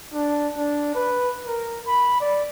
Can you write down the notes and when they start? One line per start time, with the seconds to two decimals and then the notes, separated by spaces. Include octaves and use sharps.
0.14 D4
0.57 D4
0.95 B4
1.47 A#4
1.87 B5
2.21 D5